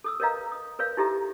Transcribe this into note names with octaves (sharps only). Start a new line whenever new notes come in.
A4 D#6 E6
A#4 B4 C#5 D#5 F5 A#5
D#6
A#4 B4 C#5 F5
D#4 E4 G4 A4 E5 A#5